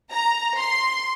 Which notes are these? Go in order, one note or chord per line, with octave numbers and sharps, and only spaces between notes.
A#5
C6